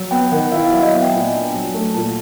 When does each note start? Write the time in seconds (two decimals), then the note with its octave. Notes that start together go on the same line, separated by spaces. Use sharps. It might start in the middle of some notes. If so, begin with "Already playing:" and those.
Already playing: F#3
0.11 B3 G5
0.32 D#3 F#5
0.52 E4 F5
0.72 F#3 E5
0.82 D#5
0.92 B3 D5
1.02 G5
1.12 A#2 G#5
1.33 D4
1.54 F#3
1.74 A3
1.94 A#2 A5